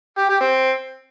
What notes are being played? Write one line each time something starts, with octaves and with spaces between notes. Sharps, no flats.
G4
G4
C4